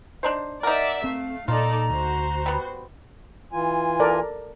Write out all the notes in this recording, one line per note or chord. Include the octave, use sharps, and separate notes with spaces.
D4 D#4 C5
D#4 A#4 D5 E5 F#5
A3 C4 F5
A#2 D#4 F4 A4 D5 A#5
D2 F#4 C5
G3 B3
E3 F4 G#5
A4 A#4 D5